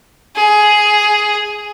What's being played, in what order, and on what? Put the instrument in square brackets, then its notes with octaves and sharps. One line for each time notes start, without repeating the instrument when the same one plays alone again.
[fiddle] G#4